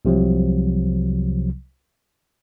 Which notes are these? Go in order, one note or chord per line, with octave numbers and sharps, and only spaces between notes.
C2 C3 F3 F#3